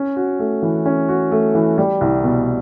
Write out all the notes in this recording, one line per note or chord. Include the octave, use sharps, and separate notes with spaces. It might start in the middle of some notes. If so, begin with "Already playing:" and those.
Already playing: C#4
F#4
A3
E3
C#4
F#4
A3
E3
G3
C2
B2